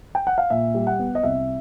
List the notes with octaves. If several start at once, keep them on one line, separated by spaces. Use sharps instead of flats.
G5
F#5
F5
A#2 E5
G3
F#5
B3
D#5
C2 E5